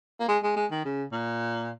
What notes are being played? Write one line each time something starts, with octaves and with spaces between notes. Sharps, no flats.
A#3
G#3
G#3
G#3
D#3
C#3
A#2